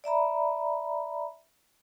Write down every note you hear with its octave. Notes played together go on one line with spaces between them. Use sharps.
D5 E5 A#5 B5